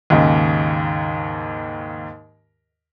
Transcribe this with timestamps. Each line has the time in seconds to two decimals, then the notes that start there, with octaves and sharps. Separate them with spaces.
0.10 D#2 G#2 C#3